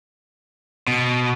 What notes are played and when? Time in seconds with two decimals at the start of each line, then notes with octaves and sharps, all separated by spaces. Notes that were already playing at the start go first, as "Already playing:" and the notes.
0.88 B2